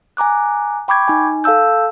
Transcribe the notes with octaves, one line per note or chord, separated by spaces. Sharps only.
G#5 A#5 D6 F#6
G5 B5 C#6 D6 G6 G#6
D#4 G#5
A4 F5 A5 E6 G6